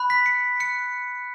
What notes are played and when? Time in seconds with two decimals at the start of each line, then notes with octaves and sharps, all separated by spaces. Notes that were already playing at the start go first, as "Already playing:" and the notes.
Already playing: B5 F#6
0.10 B6
0.26 C#7
0.60 F#6 C#7